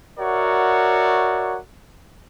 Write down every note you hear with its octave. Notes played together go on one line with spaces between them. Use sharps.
F#4 A#4 C#5 D5 E5 F#5